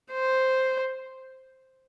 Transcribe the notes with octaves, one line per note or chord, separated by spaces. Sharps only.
C5